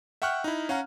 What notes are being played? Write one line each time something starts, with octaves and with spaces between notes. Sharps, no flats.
E5 F#5 G5 C#6 F6 F#6
D#4 E4
C#4 F5 F#5 A#5